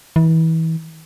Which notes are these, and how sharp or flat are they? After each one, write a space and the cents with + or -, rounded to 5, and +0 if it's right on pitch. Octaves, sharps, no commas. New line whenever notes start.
E3 -30